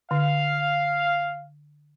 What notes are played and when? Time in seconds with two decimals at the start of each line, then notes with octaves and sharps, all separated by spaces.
0.11 D3 F5